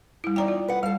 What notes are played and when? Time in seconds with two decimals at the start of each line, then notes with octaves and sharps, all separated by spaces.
0.24 G3 E4
0.36 E2 D#4 D5 G5 A#5
0.48 F4
0.68 B4 F#5
0.83 G3 A4 F5